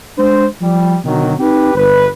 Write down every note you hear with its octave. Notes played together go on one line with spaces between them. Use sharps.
G#3 D4 C5
F3 G3
B2 D3 D#3 F#3
C4 D#4 G4 B4
G1 B4